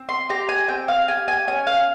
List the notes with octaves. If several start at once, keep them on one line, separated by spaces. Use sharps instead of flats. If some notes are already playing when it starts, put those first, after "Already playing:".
Already playing: C4
C6
G4 A#5
G#5
C4 G5
F5
G4 G#5
G#5
C#4 G#5
F5